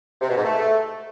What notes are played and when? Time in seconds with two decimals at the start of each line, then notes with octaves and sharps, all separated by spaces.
0.21 C3
0.29 B2
0.36 G#2
0.44 A3